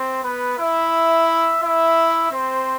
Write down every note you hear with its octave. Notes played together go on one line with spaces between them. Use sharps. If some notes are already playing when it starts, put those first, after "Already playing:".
Already playing: C4 C5
B3 B4
E4 E5
E4 E5
C4 C5